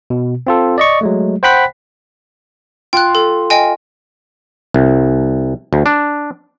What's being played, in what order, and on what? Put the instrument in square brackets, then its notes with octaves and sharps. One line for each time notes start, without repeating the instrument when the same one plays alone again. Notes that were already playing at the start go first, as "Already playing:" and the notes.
[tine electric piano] B2
C4 F4 A4
D5 D#5 C#6
F#3 G#3 A3
C5 F#5 G5 B5 F#6 B6
[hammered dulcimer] F4 [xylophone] G5 F#6
[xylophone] A4
D#5 G5 G#5
[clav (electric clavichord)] C2
D2
D4